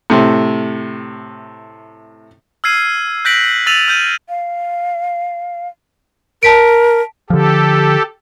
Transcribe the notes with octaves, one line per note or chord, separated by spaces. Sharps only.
A2 C3
E6 F6 G#6 C7 D#7
F#6 G6 A#6 B6 D7 F#7
E6 A6 D#7 F7 F#7
F6 G6 D#7
F5
A#4 A5 B6 D7
D3 F3 G4 A4